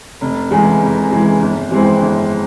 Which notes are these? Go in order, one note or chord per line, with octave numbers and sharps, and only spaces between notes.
F1
E2 E3 G#3
F1
E2 E3 G#3
G1
F2 E3 G#3 C4
G1